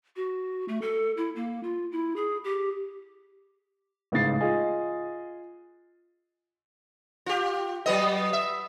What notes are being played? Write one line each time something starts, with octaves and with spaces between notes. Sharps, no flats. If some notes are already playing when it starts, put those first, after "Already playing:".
F#4
A3
A4
E4
A#3
F4
E4
G#4
G4
A1 G#2 C#3 A6 C7
F4 G#4 D#5
F4 G4
F#3 B3 D#5
E5